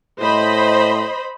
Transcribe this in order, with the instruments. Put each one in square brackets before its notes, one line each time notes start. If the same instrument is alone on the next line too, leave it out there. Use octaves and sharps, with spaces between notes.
[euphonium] A2 [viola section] C5 D#5 B5